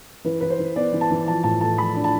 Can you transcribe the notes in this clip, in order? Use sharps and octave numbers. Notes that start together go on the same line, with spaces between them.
E3 B4
E3 B4
C5
E3
B3 D5
E3
A5
E3
F3 A5
A2 A5
A3 A5
F3 B5
D4
A5